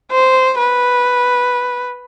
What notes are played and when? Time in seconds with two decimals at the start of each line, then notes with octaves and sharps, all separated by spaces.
0.11 C5
0.58 B4